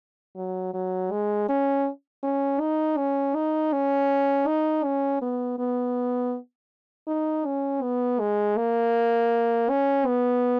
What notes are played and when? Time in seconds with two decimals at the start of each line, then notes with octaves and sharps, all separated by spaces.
0.36 F#3
0.74 F#3
1.11 G#3
1.49 C#4
2.23 C#4
2.60 D#4
2.97 C#4
3.35 D#4
3.73 C#4
4.47 D#4
4.84 C#4
5.22 B3
5.59 B3
7.08 D#4
7.45 C#4
7.82 B3
8.20 G#3
8.57 A#3
9.70 C#4
10.07 B3